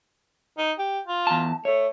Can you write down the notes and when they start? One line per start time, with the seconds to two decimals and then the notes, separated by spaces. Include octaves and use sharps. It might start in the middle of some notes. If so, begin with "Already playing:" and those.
0.58 D#4
0.79 G4
1.07 F4
1.27 E2 A5
1.65 A3 C#5